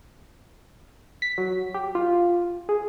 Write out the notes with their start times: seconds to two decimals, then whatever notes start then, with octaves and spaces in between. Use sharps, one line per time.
1.22 B6
1.38 F#3
1.74 G4
1.95 F4
2.69 G#4